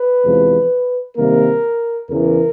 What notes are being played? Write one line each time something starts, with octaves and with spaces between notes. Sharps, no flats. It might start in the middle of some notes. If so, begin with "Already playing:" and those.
Already playing: B4
E2 C3 F3 G#3
C3 D#3 G3 A#3 A#4
E2 C#3 E3 A#4